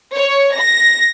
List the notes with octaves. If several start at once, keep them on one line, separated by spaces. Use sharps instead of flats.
C#5
A#6